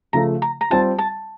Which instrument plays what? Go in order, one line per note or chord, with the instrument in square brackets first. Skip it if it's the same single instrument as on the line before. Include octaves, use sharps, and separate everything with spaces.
[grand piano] C#3 F3 A3 [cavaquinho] A#5
[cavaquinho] A#5
A#5
[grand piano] G3 C4 F4 [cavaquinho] A5
[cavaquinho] A5